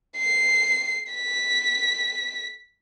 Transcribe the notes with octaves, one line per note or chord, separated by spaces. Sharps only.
C7
B6